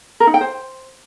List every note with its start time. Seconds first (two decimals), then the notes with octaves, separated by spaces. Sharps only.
0.20 A#4
0.27 D#4
0.34 G5
0.41 C5